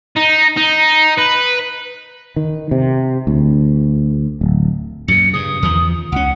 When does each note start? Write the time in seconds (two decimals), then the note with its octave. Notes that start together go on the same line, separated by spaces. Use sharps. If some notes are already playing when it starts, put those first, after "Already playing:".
0.17 D#4
0.57 D#4
1.18 B4
2.36 D#3
2.71 C3
3.27 D2
4.41 D1
5.08 F#2 A#2 C#7
5.33 G2 C#3 D#6
5.62 E2 D#3 F3
6.12 C#2 C#4 F#5